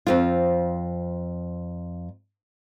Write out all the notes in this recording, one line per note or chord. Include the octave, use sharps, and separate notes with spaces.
F2 C4 F4